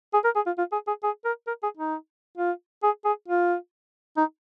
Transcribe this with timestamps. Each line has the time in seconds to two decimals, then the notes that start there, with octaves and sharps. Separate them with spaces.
0.13 G#4
0.24 A#4
0.35 G#4
0.46 F4
0.58 F4
0.72 G#4
0.87 G#4
1.03 G#4
1.25 A#4
1.47 A#4
1.63 G#4
1.77 D#4
2.37 F4
2.83 G#4
3.05 G#4
3.28 F4
4.17 D#4